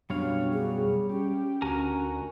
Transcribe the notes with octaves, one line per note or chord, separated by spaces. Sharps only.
F#2 B2 F#3 G3 D4 C#5 F5
G#4
C#4 G4
D2 F#4 A#4 G#5 A#5